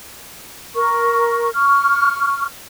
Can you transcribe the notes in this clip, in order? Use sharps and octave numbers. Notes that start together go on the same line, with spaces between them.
A#4 C#6
C#6 F6